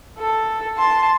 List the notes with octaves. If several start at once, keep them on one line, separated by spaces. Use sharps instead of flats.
A4
A5 C6